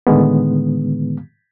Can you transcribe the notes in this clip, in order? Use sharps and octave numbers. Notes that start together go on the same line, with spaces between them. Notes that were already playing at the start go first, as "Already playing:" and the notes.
A2 D3 D#3 G#3 B3